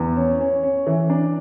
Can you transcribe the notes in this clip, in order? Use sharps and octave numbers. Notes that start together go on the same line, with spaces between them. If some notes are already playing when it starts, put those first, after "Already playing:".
Already playing: E2
C#4
C#4
C#4
E3
D4